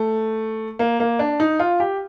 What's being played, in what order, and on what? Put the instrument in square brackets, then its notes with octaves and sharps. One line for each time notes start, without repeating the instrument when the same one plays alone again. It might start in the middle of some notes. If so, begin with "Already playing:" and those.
Already playing: [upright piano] A3
A#3
A#3
D4
D#4
F4
G4